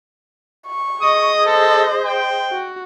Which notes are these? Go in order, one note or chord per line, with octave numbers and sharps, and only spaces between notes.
C#6
G#4 D#5 D#6
A4 C5
G5
F#4